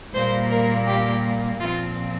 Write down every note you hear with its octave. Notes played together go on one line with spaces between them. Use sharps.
A#2 G3 A#3 C5
A#4
G4
A#2 F3 C4 F4